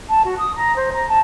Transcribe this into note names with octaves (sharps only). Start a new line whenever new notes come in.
A5
F#4
D#6
A#5
C5
A#5
A5